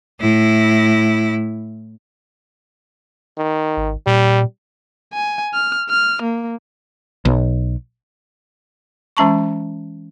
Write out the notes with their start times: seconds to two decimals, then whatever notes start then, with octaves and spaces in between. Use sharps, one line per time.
0.20 A2 E4
3.38 D#3
3.77 G#1
4.07 A#2 G3
5.13 G#5
5.54 F6
5.89 F6
6.22 A#3
7.25 B1
9.17 E3 G#3 C#4 A5 A#5 C#6